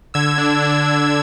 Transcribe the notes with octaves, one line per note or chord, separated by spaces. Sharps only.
D3 E6 G#6
D4
D4
D4